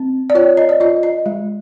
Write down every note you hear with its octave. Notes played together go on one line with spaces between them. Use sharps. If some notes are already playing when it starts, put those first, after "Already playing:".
Already playing: C4
D5
F4 C#5
D#5
D5
F4 D#5
D#5
G#3